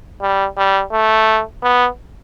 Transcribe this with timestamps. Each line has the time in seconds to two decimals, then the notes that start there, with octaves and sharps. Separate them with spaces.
0.22 G3
0.57 G3
0.92 A3
1.63 B3